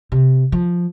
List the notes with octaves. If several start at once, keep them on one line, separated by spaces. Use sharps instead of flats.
C3
F3